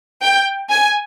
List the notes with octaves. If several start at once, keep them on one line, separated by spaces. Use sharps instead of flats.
G5
G#5